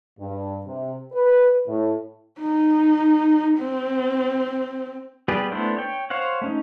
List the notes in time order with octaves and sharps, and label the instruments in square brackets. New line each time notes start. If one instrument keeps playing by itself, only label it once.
[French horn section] G2
C3
B4
A2
[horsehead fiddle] D#4
C4
[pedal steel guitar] G3 B3 G4 G#4 B4
A3 B3 D4 E4 C5
C#5 G5
C5 C#5 F5 F#5
A3 C#4 D#4